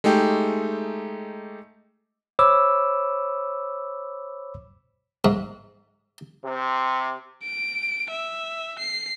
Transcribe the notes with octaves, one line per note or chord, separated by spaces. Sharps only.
G#3 A3 D#4 G4
C5 C#5 B5 D6 E6
G#2
C3
D7
E5
C7